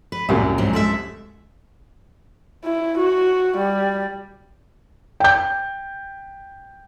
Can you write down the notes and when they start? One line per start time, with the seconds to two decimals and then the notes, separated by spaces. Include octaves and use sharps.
0.12 B4
0.29 C2 F#2 A#2 A#3
0.58 G#2 F#3 D4
0.73 G#3 A4 E5
2.65 E4
2.98 F#4
3.58 G3
5.20 G5 G6